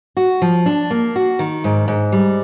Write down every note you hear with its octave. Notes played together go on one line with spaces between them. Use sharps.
F#4
F3
D4
A#3
F#4
D#3
G#2
G#2
G3